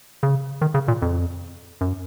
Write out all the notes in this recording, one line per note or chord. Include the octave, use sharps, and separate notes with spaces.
C#3
D#3
C#3
A#2
F2
F#2